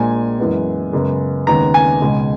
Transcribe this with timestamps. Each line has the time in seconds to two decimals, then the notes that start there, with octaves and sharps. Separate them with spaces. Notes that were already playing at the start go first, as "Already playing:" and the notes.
Already playing: A#1 A#2 G#3 G#5
0.39 F#2 E3 G#3 B3
0.93 F#2 C#3 G#3 B3
1.47 D#2 C#3 G#3 B3 A#5
1.74 G#5
2.01 C#2 B2 G#3